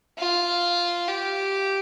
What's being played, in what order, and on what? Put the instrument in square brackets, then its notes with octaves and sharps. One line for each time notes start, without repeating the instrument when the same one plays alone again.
[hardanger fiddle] F4
G4